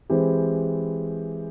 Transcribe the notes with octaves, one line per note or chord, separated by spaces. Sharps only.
E3 G#3 C4 E4 G4